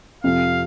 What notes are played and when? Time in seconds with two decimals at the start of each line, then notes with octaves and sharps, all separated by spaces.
0.24 F2 C3 F3 F5